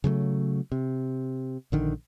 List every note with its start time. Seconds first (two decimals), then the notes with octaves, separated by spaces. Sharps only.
0.04 C#3 F#3 G3 A3
0.72 C3
1.72 A#1 D3 D#3